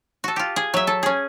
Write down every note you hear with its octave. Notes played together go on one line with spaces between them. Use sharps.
F#4 A4
F4 G4
G#4
F#3 E5
A4
C#4 G#4